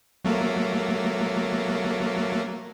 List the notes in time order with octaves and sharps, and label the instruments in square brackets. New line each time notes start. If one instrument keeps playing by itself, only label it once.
[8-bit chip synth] F#3 A3 A#3